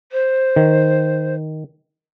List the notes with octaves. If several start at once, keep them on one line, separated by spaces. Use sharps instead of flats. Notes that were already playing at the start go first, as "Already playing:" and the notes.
C5
D#3